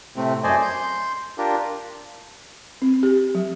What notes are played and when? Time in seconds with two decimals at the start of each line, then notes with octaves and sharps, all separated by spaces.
0.16 A2 C3 A3 C4
0.44 F#2 A3 C5 D5 D#5 G#5
0.62 C6 G6
1.38 D4 F4 G4 A#4
2.82 C4
3.03 G4
3.35 F#3